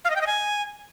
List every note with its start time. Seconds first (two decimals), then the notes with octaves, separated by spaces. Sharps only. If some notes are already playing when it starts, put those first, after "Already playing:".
0.05 F5
0.10 D#5
0.16 G5
0.21 D#5
0.27 G#5